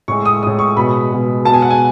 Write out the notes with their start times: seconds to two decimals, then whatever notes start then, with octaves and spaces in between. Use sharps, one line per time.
0.08 A2 G#3 C#6
0.25 D#6
0.42 A2 G#3 D#6
0.59 C#6
0.77 B2 G#3 B5
1.11 B2 G#3
1.45 B2 A5
1.49 G#3 G#5
1.62 F#5
1.70 G#5